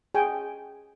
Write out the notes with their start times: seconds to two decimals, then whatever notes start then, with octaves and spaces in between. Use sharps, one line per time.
0.14 G#4 G5 G#5